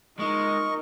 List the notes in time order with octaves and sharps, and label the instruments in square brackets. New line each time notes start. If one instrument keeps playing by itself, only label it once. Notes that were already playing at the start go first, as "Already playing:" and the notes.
[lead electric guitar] G#3 [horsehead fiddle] D#4 A#4 [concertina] D#5 C#6